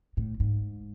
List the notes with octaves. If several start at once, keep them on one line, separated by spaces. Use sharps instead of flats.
A2
G#2